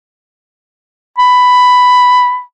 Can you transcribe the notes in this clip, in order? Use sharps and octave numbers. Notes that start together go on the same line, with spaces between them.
B5